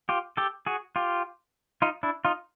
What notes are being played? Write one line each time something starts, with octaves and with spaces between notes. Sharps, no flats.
F4 G4
G4 A4
F#4 G#4
F4 G4
D#4 F4
D4 E4
D#4 F4